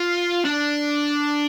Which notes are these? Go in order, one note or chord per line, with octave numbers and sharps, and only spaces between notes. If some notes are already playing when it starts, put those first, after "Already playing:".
Already playing: F4
D4